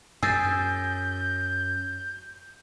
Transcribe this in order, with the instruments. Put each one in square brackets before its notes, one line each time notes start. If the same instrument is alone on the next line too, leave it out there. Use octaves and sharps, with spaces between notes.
[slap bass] F#2 [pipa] G#4 [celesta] E6 A6 [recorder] G6